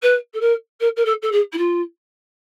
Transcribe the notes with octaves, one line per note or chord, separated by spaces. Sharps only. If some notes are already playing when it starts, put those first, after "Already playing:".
B4
A4
A#4
A#4
A#4
A4
A4
G#4
E4
F4